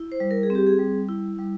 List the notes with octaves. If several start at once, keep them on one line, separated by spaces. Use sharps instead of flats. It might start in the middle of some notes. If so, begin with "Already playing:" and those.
Already playing: E4
C5
G3
A#4
G#4
C4 G4
G#4
G3
E4
G3